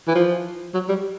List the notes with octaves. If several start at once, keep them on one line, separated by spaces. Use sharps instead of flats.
E3
F3
F#3
G3